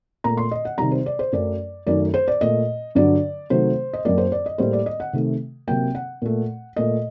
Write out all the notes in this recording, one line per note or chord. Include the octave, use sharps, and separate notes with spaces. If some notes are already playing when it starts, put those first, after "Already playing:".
A#2 A3 A#5
C6
D#5
F#5
C3 D#3 G3 A#5
C5
D5
C5
F#2 F#3 A3 D5
F#2 D#3 A3 D5
C5
D5
A#2 A3 D#5
G2 D3 F#3 D5
C3 D#3 F#3 A3 C5
D#5
F#2 F#3 A#3 D5
C5
D5
D#5
A2 G3 A#3 C5
D5
D#5
F#5
C3 D#3 A3
C3 F#3 A#3 G5
F#5
A#2 A3
A#2 A3 D#5